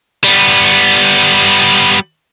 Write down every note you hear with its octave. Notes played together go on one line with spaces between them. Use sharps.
G3 B3